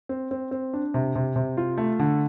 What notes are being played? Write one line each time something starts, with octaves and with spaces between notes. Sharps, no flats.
C4
C4
C4
D4
C3
C3
C3
F4
A3
D3